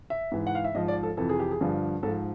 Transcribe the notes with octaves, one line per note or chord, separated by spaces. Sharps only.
E5
G#2 E3
F#5
F5
E5
G#2 F3 D#5
D5
A4
F2 C3 E3 A4
G#4
G4
G#4
G2 D3 F3
G#2 F3 A4